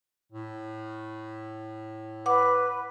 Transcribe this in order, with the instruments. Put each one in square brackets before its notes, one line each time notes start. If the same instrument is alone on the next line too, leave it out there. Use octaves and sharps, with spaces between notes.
[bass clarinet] A2
[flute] B4 [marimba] F#5 D6